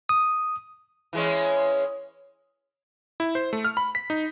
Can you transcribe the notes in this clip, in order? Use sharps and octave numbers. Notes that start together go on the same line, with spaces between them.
D#6
E3 G#3 C#4
E4
C5
A3
F6
B5
B6
D#4